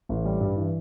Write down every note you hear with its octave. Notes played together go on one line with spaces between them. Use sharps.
A1
G3
G2
E3